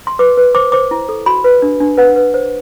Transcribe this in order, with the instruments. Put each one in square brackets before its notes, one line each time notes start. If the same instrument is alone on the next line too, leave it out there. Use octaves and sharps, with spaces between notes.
[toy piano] C6
B4 D6
B4
C5 D6
C5 D6
E4
A4
F#4 B5
B4
D4
D4
B4 F#5
B4
C5